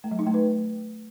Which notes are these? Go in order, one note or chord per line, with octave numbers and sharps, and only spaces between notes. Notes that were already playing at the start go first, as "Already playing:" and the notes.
A3
F#3
D#4
A3
B4